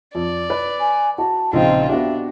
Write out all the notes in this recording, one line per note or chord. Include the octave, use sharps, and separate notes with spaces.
F2 D5
B4
G#5
F#4 A5
A#1 C#3 C4 D#4 F4 D#5
B3 D4 F#4 G4 E5